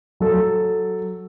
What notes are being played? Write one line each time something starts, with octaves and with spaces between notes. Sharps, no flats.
F#3 A4